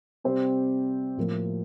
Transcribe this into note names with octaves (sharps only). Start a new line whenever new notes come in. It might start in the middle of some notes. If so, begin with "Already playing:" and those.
C3 G3 C4 G4 C5
A2 F3 A#3